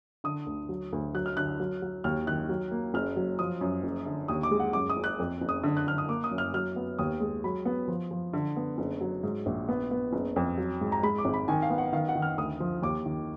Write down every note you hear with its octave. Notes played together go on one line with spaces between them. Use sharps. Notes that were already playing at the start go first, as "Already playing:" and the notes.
D3 D#6
D2
F#3
D2
F#3 F#6
F6
D3 F#6
F#3
F#3
D#2 F6
D#3 F#6
F#3
A#3
F#1 F6
F#3
F3 D#6
F#2
F#1
D3
D#2 D#6
D6
G#3
F#5
F#2 D6
D#6
F#1
F#6
F2
F#1
D#6
D3
F#6
D3 F6
D#6
A#3 D6
D#6
F#2
F6
F#3 F6
B3
D#2 D#6
G#3
F#3 B5
B3
F3
F3
D3
B3
F#1
F#3
G#2
A#1
B3
B3
F#1
F2
F#3
G#2
A#5
G#3 B5
D6
G#1
B5
D#3 G#5
F5
B3
F#5
D#3 F5
F#5
D#3
F6
D2 D#6
F3
D#2 D6
D#3